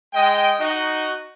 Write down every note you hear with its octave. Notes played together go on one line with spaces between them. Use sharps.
G#3 D#5 G5
D#4 F#4 D#5